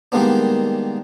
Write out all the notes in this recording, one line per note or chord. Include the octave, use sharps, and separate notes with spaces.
D#3 G3 G#3 A#3 B3 D4